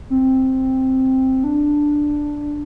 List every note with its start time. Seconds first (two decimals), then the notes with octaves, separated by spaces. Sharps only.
0.10 C4
1.44 D4